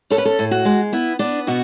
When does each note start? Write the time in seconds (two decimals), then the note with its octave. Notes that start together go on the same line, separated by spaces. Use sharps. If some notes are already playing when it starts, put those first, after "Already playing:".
0.10 C#4 A4
0.18 B4
0.25 A4
0.39 A2
0.51 F#4
0.65 G#3
0.92 B3 E4
1.19 B3 D4
1.47 B2 F#4